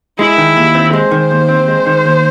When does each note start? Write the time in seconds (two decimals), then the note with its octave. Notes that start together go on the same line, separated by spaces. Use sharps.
0.19 G#3 E4
0.38 D#3
0.57 D#2
0.75 C4
0.93 G#3 C5
1.11 D#3
1.31 D#2
1.49 C4
1.68 G#3
1.86 D#3
2.06 D#2